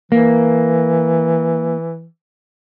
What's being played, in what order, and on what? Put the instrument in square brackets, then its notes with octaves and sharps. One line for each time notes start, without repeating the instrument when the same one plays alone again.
[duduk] E3 [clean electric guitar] A#3